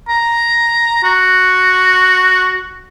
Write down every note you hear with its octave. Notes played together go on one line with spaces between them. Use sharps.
A#5
F#4